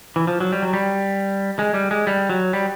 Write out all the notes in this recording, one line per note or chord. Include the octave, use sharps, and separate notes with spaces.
E3
F3
F#3
G3
F#3
G3
G#3
G3
G#3
G3
F#3
G3